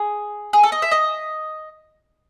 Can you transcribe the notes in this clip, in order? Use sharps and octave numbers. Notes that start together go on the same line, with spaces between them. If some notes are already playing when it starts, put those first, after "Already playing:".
Already playing: G#4
G#4
A4
D#5
E5
D#5